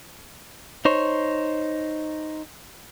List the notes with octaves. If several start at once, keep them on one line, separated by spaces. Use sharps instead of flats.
D#4 C5 C#5